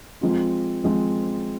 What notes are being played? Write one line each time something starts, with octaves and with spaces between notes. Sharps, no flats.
F3 G#3 C4 F4
F3 G#3 C4 F4